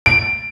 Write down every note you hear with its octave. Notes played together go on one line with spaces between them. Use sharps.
D7